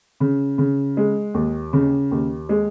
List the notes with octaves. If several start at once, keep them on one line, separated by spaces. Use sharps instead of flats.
C#3
C#3
G#3
D#2
C#3
D#2
G#3